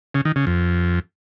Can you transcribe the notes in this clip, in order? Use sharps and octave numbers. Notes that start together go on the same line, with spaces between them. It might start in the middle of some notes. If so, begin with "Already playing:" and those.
C#3
D#3
C#3
F2